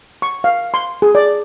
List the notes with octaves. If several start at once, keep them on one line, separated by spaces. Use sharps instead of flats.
C#6
F5
C6
G#4
D5